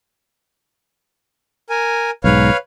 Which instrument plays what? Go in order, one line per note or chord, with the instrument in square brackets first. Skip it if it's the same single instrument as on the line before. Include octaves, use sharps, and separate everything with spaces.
[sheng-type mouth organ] A#4 G#5
[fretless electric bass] B1 G#2 [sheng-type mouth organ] B4 C#5 F5